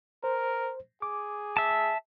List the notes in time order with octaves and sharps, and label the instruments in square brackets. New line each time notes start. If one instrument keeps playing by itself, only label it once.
[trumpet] A#4 [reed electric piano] C5
[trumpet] G#4 [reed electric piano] D6
[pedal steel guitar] E5 A5